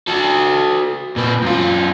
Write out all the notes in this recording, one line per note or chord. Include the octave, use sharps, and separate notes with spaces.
F#4 A4
A#2 B4
F#2 F4